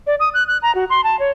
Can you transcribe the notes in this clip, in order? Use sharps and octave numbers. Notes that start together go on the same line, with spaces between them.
D5
D#6
F#6
F#6
A#5
F#4
C6
A5
C#5